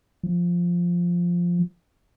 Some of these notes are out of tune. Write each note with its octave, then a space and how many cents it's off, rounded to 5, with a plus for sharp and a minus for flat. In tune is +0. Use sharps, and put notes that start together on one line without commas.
F3 +0